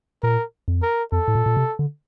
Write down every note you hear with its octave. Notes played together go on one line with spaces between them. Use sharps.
A#2 A#4
F2
A#4
F2 A4
A2
A#2
A#2
C3
D3